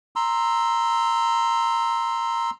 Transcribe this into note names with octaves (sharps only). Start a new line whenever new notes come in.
A#5 C6 E6